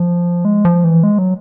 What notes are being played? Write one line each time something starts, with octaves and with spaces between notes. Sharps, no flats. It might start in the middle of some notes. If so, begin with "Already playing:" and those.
Already playing: F3
G#3
F3
E3
G#3
F#3